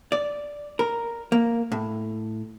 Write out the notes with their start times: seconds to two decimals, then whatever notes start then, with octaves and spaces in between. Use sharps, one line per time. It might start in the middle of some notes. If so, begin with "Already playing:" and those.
0.12 D5
0.79 A#4
1.32 A#3
1.72 A2